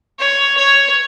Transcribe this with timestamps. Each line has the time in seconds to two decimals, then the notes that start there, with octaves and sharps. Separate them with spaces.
0.19 C#5
0.58 C#5